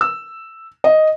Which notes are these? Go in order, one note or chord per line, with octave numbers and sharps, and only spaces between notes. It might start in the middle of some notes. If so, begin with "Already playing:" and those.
E6
D#5